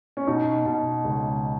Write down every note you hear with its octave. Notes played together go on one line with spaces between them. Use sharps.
C#4
B2 D#4
B2
C#2